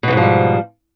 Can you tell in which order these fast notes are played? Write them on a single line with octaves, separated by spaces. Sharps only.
B2 E2 G#2 F3 G3